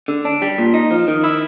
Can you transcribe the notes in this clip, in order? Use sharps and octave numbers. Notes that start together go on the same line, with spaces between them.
D3
D4
G3
A#2
D#4
F3
D#3
E4